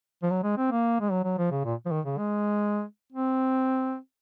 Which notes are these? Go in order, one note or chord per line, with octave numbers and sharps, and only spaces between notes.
F3
F#3
G#3
C4
A#3
G#3
F#3
F#3
F3
C#3
A#2
F3
D#3
C#3
G#3
C4